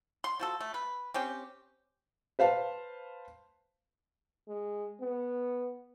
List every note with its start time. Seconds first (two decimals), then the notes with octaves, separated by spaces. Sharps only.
0.24 C6
0.40 F3 F#4 A4
0.61 A3
0.74 B4
1.14 C4 C#4 G4
2.39 B4 C5 F5 A5
4.48 G#3
5.01 B3